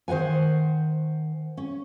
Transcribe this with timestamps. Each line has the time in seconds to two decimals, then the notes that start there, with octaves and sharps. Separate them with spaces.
0.08 D#3 C5 E5 F#5 G#5
1.57 C#4